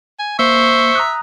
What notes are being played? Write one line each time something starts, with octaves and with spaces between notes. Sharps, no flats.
G#5
A#3 C5 E5 C#6
A#5 D#6 F#6